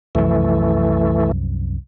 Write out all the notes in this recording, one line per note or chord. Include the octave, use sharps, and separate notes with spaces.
C2 F#2 E3 F3 A3